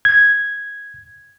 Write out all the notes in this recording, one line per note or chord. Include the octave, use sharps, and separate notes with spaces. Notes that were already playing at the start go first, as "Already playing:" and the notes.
G#6